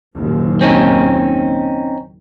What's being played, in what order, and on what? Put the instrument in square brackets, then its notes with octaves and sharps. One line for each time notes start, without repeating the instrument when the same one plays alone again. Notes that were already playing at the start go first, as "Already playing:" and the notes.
[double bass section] F#1 D#2 A#2
[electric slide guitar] C4 C#4 D#4